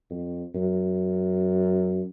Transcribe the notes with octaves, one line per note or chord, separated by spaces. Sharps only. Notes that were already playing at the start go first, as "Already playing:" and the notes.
F2
F#2